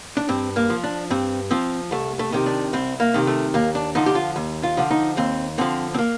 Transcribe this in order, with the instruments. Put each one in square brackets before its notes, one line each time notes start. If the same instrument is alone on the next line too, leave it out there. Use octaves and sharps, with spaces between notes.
[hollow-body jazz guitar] D4
G2 C4
A#3
F3
D4
G2 C4
F3 C4
C2 A3
A3
C3 D#3
D4
C2 C4
A#3
C3 D#3
A3
D#2 A#3
D4
D3 F3 D#4
G4
F4
D#2
F4
D3 F3
D#4
D#2 C4
D3 F3 C4
C4
A#3